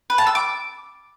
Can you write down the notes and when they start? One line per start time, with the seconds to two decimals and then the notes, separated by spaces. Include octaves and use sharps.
0.10 B4
0.18 A5
0.27 E6
0.35 D6